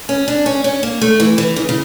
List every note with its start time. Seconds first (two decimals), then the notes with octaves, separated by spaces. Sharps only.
0.09 C#4
0.28 D4
0.46 C#4
0.64 C#4
0.83 A#3
1.01 A3
1.20 E3
1.38 E3
1.56 C#3
1.69 C#3